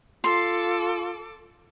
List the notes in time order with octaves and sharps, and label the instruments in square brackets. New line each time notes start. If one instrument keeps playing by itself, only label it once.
[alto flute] F4 [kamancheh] A4 D6 [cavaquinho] C6